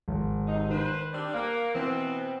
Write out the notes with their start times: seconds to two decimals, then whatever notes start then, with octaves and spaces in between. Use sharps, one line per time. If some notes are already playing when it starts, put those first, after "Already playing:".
0.08 G#1
0.47 C3 D#4
0.70 D#3 B4 C5
1.13 G3 C4 D4
1.34 A#3 F#6
1.74 B2 E3 B3 C4